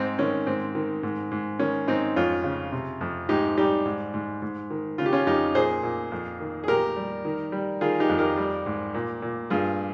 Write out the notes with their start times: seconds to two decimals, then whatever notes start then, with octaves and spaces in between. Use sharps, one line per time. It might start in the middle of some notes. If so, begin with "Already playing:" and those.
Already playing: G#2 C4 D#4
0.19 D#3 C#4
0.47 G#2 C4
0.75 D#3
1.03 G#2
1.31 G#2
1.59 D#3 C#4
1.88 G#2 C4 D#4
2.16 F2 C#4 F4
2.44 C#3
2.72 C3
3.01 F2
3.29 G#2 D#4 G4
3.57 G3 D#4 G4
3.85 G#2
4.14 G#2
4.42 G#2
4.70 D#3
4.98 C#3 F4
5.06 G4
5.13 C#4 F4
5.27 F2 D#4 G4
5.55 A#2 G#4 C5
5.83 A#2
6.12 F2
6.40 D#3
6.64 G#4
6.68 A#2 G4 A#4
6.97 G3
7.25 D#3
7.52 G3
7.81 D#3 F4 G#4
8.00 D#4 G4
8.09 F2
8.18 G4 A#4
8.37 G3
8.66 G#2
8.94 A#2
9.22 A#2
9.50 G2 F4 G#4